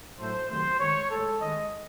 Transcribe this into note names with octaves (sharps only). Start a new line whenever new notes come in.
A2 F#3 A3 C5
C3 D#3 F#3 A3 C5
D#3 G#3 C#5
A2 G#3 A4
D#3 G#3 D#5